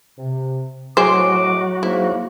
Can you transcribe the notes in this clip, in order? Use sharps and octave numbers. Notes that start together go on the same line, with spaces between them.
C3
A2 F#3 F#4 G#4 C5 D#5 D6
G#2 A#3 E4